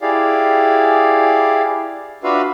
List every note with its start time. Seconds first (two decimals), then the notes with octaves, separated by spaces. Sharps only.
0.02 E4 G4 G#4 D5 F5
2.24 D4 F4 F#4 B4 E5 F5